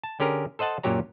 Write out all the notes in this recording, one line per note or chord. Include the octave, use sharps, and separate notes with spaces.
A5
D3 C#4 G4 G#4 A#4
A4 C5 D#5 F#5 A5
F#2 A#2 F#3 G4 C#5 A#5